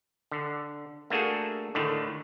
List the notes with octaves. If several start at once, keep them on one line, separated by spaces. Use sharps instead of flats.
D3
A3 A#3 D4 F#4 G#4 A4
A2 D3 D#3 A3